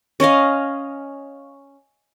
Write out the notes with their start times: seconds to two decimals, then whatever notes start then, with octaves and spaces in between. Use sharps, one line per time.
0.20 C#4 C#5 D#5 F5